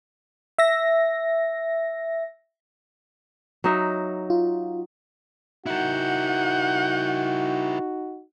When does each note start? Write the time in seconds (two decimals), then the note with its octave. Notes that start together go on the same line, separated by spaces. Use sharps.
0.58 E5 A#6
3.64 F#3 D#4 E5
4.30 F4
5.66 D#4 E4 F#4 A#4 F#5 G6